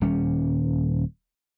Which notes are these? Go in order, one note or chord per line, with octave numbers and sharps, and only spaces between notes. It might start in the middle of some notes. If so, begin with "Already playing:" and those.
D#1 G3 C#4